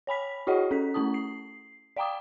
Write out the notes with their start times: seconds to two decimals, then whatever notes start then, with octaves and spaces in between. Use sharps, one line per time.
0.07 C#5 G#5 B5 B6
0.47 E4 F#4 G#4 C#5 D#5 F#5
0.71 C#4 A4 B6
0.94 A3 C#4 E4 A5 D#6
1.14 C7
1.96 D5 F5 G5 A#5 D6 D#6